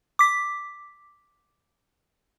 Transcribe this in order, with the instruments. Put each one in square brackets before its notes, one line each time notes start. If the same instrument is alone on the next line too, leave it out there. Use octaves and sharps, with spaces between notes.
[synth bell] D6 B6